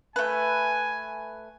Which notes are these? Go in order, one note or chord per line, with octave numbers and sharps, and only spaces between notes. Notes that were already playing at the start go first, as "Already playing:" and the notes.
A3 B4 G#5